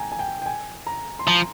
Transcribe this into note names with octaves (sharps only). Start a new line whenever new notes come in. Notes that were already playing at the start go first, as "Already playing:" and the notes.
Already playing: G5 G#5 A#5
G#5
G5
G5
G#5
A#5
C6
F3 A#5